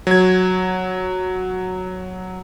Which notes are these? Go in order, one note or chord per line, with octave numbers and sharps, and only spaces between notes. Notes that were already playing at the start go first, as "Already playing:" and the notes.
F#3 G#6